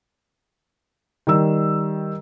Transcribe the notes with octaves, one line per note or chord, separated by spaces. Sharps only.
D#3 G3 E6